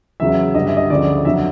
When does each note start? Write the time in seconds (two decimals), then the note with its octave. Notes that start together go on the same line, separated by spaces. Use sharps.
0.20 E2 C#3 F#3 E5
0.55 G2 D3 G3 D#5
0.67 E5
0.77 D#5
0.90 D2 C#3 F3 D5
1.25 F2 D3 F#3 E5